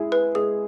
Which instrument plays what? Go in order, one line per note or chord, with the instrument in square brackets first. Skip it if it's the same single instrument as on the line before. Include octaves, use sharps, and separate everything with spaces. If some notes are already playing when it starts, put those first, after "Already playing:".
Already playing: [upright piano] G#3 E4 G#4
[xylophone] B4
[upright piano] G#3 [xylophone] G#4